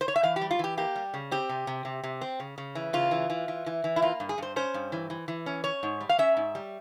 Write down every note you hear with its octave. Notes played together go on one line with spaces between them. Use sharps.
C5
C#5
E5
E3 F5
G4
G3
F4
E3 G4
A#3 G4
G3
C#3
C4 G4
C3
C3
C3
C3
C4
C#3
C#3
E3
C#3 F4
E3
E3
E3
E3
E3
E4
A#3 F4
G2
G#4
G2 C5
C#4 C5
G2
E3
E3
E3
C#4
C#4 C#5
G#2
G3
F5
C#4 E5
G#2
G3